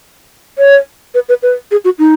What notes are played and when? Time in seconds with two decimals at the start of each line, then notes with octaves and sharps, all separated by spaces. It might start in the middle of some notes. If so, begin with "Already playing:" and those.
0.58 C#5
1.14 B4
1.29 B4
1.43 B4
1.71 G#4
1.85 F#4
1.99 D#4